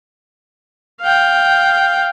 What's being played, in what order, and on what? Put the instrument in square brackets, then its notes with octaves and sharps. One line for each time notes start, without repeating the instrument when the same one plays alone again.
[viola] F5 G5